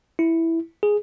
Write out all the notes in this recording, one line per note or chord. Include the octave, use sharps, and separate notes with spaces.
E4
G#4